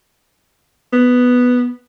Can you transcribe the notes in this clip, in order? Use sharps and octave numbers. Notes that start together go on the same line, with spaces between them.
B3